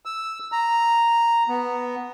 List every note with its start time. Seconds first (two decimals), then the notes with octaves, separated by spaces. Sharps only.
0.05 E6
0.52 A#5
1.48 B3